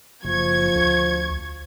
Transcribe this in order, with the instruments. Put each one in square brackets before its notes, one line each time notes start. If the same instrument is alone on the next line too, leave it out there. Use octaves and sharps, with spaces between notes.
[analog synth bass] F#1 [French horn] F3 [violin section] C#6 G#6
[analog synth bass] D2